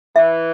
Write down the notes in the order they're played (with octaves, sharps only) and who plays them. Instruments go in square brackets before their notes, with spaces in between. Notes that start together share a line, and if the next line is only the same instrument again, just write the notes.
[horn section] E3 [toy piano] E5